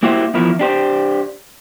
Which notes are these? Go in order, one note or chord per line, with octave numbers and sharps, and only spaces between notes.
A#3 E4 F#4 G4 C5 E5
E2 F3 E4 A#4
D4 G4 C5